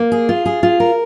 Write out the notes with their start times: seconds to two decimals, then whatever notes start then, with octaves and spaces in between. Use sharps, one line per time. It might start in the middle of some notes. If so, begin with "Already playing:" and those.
Already playing: A#3
0.12 G#4
0.29 F4
0.46 G#4
0.63 F4
0.80 A#4